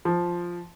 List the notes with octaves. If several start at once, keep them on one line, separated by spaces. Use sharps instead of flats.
F3